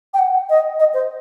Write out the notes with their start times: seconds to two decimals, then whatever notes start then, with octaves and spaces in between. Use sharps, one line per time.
0.14 G5
0.19 F#5
0.50 D#5
0.79 D#5
0.94 C5